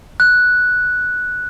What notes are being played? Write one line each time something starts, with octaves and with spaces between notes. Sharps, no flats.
F#6